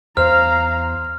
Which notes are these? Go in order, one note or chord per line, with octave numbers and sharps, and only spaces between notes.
E2 C5 F5 A#5 F6